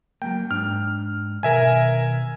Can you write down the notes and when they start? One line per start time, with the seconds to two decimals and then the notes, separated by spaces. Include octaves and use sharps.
0.22 F#3 A3 A#3 G5
0.51 G#2 D4 F6
1.43 B2 D#3 A#4 E5 G#5